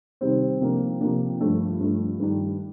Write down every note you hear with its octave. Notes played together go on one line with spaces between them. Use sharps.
C3 D#3 G3 C4
C3 F3 A#3 D4
C3 F3 A#3 D4
G2 F3 A3 D4
G2 F3 A3 D4
G2 D#3 G3 D4